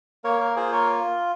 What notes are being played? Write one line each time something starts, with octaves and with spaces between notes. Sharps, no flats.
A#3 A#4 C#5
A#4
F4 G#4 C5
A#4 C#5